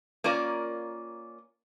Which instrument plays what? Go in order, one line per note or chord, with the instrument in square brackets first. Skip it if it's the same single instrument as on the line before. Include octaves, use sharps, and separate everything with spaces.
[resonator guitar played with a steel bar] A#3 C#4 F4 A#4 D5